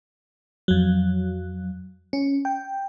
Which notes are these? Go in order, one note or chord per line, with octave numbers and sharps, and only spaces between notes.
F2 F#3
C#4
G5